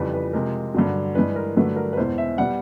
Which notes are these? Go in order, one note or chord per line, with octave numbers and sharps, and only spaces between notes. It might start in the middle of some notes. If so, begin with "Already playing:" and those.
Already playing: F2 C#3 E3 G3 B4
B4
C3 F3 G#3 A#4
G2 D3 F#3
G2 E3 G#3 B4
A#4
G2 D3 F#3 A3 B4
A#4
B4
E2 B2 G#3 C5
E5
B2 G3 F#5